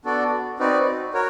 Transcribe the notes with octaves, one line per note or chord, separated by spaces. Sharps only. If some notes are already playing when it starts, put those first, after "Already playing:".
B3 D4 F#4 A4 D5
C4 D#4 F#4 B4 D5
F#4 A#4 C#5